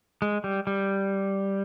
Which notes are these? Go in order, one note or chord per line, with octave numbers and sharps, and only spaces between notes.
G#3
G3
G3